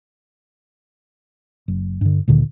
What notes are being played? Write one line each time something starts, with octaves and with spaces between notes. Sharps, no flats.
F#1
G2 D3
D2 A#2 D3 D#3